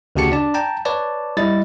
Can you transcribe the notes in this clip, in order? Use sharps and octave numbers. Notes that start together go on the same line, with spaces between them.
D2 C#3 F#4 G4 A5 C#7
D4 D5 A5
G5 A5 A#5
B4 C#5 D5 A5
G3 E4 D#5 A6